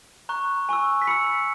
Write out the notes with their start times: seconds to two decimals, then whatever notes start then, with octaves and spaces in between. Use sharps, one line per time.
0.29 A#5 C#6 F#6
0.69 G#5 C#6 E6
1.02 B6
1.07 B5 E6 C#7